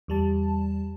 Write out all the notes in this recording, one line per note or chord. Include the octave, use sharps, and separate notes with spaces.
E2 G3 A5